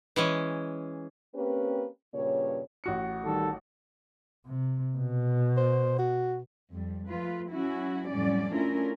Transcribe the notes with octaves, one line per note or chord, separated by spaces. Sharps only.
E3 G#3 C#4
A#3 C4 C#4 G4 B4
G2 A#2 C#3 B4 C#5
A1 F#4 C#7
D#3 G3 A4
C3
B2
C5
F#4
F2 G3
F3 A3 F4 B4
F#3 C#4 E4 F#4
F2 A2 F#3 G3 C#4 D5
A3 C#4 D4 E4 F4 A#4